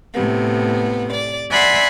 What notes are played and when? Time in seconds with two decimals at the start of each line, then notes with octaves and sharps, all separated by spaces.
0.14 A2 C3 B3
1.12 D5
1.50 D5 E5 F#5 G#5 B5 C6